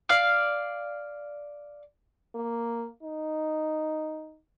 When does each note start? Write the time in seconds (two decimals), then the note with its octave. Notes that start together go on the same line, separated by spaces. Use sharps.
0.09 D5 F5
2.35 A#3
3.03 D#4